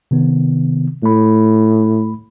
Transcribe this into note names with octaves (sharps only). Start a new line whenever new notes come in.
C3 D#3 B3
A2 A3 B5